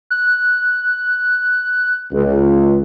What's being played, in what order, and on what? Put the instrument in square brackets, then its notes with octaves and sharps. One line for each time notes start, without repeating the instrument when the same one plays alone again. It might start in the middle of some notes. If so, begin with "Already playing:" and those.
[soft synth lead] F#6
[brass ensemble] C#2